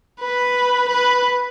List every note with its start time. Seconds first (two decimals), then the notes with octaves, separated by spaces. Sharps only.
0.20 B4
0.89 B4